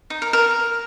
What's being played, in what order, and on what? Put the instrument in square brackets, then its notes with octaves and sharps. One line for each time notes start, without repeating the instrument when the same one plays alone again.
[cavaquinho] D#4
A#4
A#4